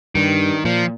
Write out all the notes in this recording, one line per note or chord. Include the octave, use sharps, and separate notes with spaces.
G2 D#3
A#2 F3